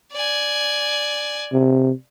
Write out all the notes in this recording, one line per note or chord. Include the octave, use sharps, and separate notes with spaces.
D5 G#5
C3